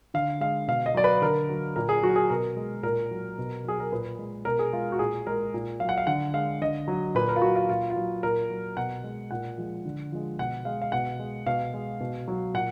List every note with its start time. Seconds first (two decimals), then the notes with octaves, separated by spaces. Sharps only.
0.14 D3 F5
0.41 G#3 F5
0.68 B2 F5
0.86 D#5
0.95 F#3 D5
1.04 B4
1.22 D3 A#4
1.49 F#3
1.76 A#2 A#4
1.89 G#4
2.02 F#3 F#4
2.16 G#4
2.30 B2 A#4
2.57 G#3
2.83 A#2 A#4
3.11 F#3
3.38 B2
3.64 F#3 G#4
3.80 A#4
3.92 A#2 B4
4.19 G#3
4.45 B2 A#4
4.59 G#4
4.73 G#3 F4
4.92 F#4
4.99 A#2 G#4
5.27 G#3 A#4
5.54 A#2
5.80 F#3 F5
5.89 F#5
5.98 F5
6.07 D3 F#5
6.34 G#3 F5
6.61 D3 D#5
6.88 F#3
7.15 A#2 B4
7.29 A#4
7.36 F4
7.42 F#3 F#4
7.56 F4
7.69 A#2 F4
7.90 F4
7.96 F#3
8.23 A#2 A#4
8.50 F#3
8.77 B2 F#5
9.04 G#3
9.31 A#2 F#5
9.58 F3 G#3
9.85 D3
10.12 F3 G#3
10.39 B2 F#5
10.65 G#3 F5
10.82 F5
10.92 B2 F#5
11.19 G#3
11.46 B2 F5
11.74 G#3
12.00 B2
12.28 F#3
12.54 A#2 F#5